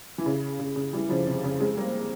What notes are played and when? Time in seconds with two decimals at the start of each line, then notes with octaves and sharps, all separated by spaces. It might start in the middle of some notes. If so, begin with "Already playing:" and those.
0.18 E3
0.26 C#3
0.59 C#3
0.76 C#3
0.93 E3 G3
1.09 C#3 F3
1.27 C3
1.44 C#3
1.60 G#3 C4
1.77 G3 A#3